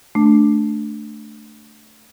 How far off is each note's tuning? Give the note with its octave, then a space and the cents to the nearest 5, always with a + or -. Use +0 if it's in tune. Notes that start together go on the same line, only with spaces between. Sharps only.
A3 -5 D4 +0